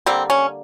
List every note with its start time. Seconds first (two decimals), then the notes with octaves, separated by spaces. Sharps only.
0.06 D3 G3 A#3 C4
0.30 C#4